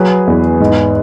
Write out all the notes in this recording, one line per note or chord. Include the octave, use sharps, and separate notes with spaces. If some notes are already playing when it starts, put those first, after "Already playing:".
Already playing: F#3 G#4 B4
E2
G#2